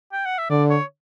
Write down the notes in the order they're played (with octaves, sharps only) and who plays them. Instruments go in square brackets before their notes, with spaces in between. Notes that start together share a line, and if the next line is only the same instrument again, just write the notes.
[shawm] G5
F#5
E5
[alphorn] D3 [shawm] D5
[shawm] C#5